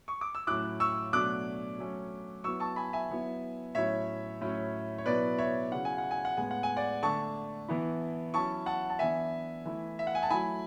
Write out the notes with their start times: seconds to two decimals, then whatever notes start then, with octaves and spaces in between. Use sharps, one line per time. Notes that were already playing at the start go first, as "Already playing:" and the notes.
0.08 C#6
0.21 D6
0.35 E6
0.47 A2 F#3 C#4 E4 D6 F#6
0.80 C#6 E6
1.13 B2 F#3 A3 D4 D6 F#6
1.78 F#3 A3 C#4
2.44 F#3 B3 E4 C#6 E6
2.60 A5 C#6
2.76 G#5 B5
2.93 E5 G#5
3.09 F#3 B3 E4
3.75 A2 F#3 C#4 E4 C#5 E5
4.41 A2 F#3 C#4 E4
4.98 C#5
5.06 B2 F#3 B3 E4 B4 D5
5.38 C#5 E5
5.72 C#3 F#3 C#4 E4 F#5
5.85 G#5
5.98 F#5
6.11 G#5
6.25 F#5
6.37 A2 G#3 B3 G#5
6.51 F#5
6.63 G#5
6.76 D5 F#5
7.03 D3 A3 D4 A5 C#6
7.68 E3 B3 E4
8.34 F#3 C#4 E4 A5 C#6
8.66 F#5 A5
8.90 A5
8.99 E3 B3 D4 E5 G#5
9.65 E3 A3 E4
9.99 E5
10.07 F#5
10.15 G#5
10.22 A5
10.30 F#3 A3 E4 G#5 B5